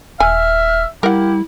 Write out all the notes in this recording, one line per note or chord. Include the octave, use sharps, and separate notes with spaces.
D#1 E5 G#5 F6
G3 A#3 E4 G4 A#4 F#5